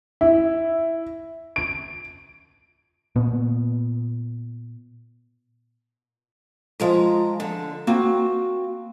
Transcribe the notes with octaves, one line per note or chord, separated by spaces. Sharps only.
E4
D7
A#2 B3
F3 G#3 A#5
D3
A#3 C4 F#4